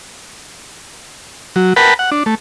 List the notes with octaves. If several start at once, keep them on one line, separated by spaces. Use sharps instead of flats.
F#3
A#4 B4 F#5 G5 A5 B5
F#5
D4
A3